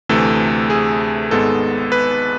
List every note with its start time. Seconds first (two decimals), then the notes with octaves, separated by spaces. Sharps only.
0.09 D2 C3 E3 A3 A4
0.70 G#4
1.31 G#1 G#2 G#3 B3 A4
1.92 B4